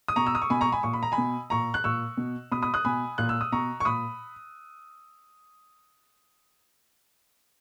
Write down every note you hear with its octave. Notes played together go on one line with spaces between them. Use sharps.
D#6
B2 A#5 C#6
E6
D#6
C#6
B2 G#5 B5
A#5 C#6
G#5 B5
A#2 C#6
B5
A#5
G#5 B5
B2
A#2 A#5 C#6
F#6
A#2 C#6 E6
B2
B2 B5 D#6
B5 D#6
D#6 F#6
B2 G#5 B5
A#2 F#6
E6
D#6
B2 A#5 C#6
C#6
A#2 B5 D#6